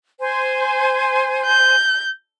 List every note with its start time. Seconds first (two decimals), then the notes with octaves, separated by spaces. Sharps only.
0.20 C5 G#5
1.46 G6